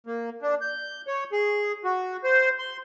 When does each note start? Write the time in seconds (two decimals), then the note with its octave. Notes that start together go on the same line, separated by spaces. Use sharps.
0.07 A#3
0.42 D4
0.61 G6
1.07 C#5
1.32 G#4
1.84 F#4
2.24 C5
2.59 C6